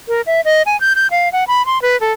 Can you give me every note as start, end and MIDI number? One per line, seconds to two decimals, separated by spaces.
0.08 0.21 70
0.26 0.41 76
0.45 0.62 75
0.66 0.79 80
0.81 0.93 91
0.96 1.07 91
1.11 1.31 77
1.32 1.44 78
1.48 1.65 83
1.66 1.81 84
1.82 1.99 71
2.01 2.13 69